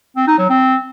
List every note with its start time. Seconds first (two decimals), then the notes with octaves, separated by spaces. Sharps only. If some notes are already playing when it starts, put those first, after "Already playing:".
0.17 C4
0.28 D#4
0.38 F#3
0.49 C4